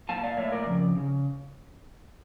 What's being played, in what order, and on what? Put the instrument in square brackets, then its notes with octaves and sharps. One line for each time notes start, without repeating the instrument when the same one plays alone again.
[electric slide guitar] A#2 A3 F5 A5
D5 F5
A#2 A3 C#5 E5
A#4 D5
F2 C#3
C#3